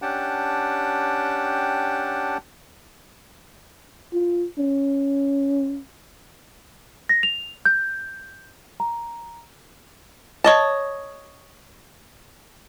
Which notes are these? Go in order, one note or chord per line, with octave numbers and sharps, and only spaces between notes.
C#4 D4 G4 F#5 G5 A5
F4
C#4
A#6
F7
G6
A#5
C#5 D#5 A5